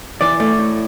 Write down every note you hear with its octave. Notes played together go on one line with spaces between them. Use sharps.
E3 D5
A3 D5
A2